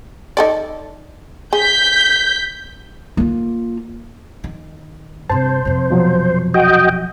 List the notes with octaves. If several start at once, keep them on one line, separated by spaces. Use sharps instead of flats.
D#4 A4 D5
G#4 G6 B6
A#3 F4
D#3
G2 C3 C5 A5
F2 C3
B2 F3 F#3
F#4 D#5 G5